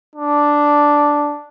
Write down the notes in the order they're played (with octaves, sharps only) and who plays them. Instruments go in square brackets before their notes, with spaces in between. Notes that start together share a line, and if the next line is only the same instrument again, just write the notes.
[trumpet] D4